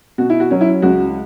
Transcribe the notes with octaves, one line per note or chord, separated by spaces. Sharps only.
B2 F#4
E4
F#4
F#3 C#4
E4
C#2 F#4